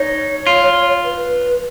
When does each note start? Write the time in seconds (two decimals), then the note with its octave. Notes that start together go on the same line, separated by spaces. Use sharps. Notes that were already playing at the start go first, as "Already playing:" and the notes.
Already playing: D#4 C#5
0.47 F4
1.04 B4